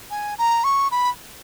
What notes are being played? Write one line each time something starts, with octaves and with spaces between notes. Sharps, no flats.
G#5
A#5
C#6
B5